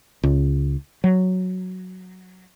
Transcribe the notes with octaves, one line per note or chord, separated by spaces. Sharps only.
C#2
F#3